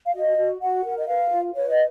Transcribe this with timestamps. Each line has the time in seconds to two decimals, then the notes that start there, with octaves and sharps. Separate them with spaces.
0.06 F5
0.14 F#4 D#5
0.37 F#4
0.61 F#4 F#5
0.84 A#4
0.98 D#5
1.07 B4 F5
1.30 F4
1.54 B4 C#5
1.68 D#5